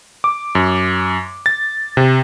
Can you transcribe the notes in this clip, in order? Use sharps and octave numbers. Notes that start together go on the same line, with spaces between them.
D6
F#2
A6
C3